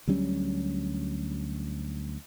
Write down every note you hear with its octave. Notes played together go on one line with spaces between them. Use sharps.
D2 F#3 G3 C#4